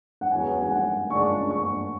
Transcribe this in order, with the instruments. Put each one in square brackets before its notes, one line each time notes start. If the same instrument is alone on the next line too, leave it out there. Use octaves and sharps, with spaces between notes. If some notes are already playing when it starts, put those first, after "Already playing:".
[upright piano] F#5
[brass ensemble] E2 C#3 F#3 B3 [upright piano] G#5
[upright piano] G#5
F#5
[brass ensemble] C#2 C#3 G#3 D4 [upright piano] C#6
[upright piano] C#6